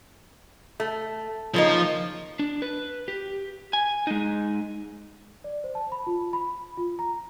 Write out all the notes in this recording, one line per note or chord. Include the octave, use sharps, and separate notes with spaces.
A3
C#3 F3 A#3 D#4
D4
B4
G4
G#5
G#3 D#4
D5
C5
A5
B5
F4
B5
F4
A#5